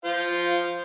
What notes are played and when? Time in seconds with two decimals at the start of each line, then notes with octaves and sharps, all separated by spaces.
0.05 F4 C5 F5